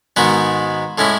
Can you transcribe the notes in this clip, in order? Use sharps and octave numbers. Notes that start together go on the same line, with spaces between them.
G#2 D#3 G#3 B3 F#4
A2 G#3 C#4 E4